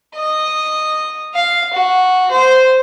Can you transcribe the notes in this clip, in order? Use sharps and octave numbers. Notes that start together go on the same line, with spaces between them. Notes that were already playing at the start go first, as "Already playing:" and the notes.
D#5
F5
F#4
C5